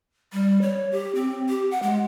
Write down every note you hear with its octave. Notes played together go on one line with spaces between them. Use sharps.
G3
C#5
G4
C4
G4
F#5
G#3